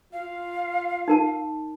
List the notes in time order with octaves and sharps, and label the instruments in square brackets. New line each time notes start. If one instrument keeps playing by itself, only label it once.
[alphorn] F4 [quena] F5
[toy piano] D#4 A#4 A5